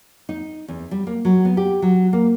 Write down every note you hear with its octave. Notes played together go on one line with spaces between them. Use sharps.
D#4
E2
G3
A#3
F#3
B3
G4
F#3
A#3